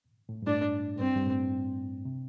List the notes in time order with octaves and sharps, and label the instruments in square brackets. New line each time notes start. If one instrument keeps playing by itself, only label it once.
[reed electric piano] A2
G2
[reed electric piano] A2 [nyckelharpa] D4
[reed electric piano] A2
[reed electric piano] G2 [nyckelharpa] C4
[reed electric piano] G2
A2
C3